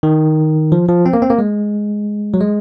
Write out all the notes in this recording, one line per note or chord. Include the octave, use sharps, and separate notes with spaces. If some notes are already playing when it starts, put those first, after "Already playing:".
D#3
F3
F3
C4
A#3
C4
A#3
G#3
F#3
G#3